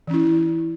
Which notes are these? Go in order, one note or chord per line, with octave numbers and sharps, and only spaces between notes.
E3 C#4 E4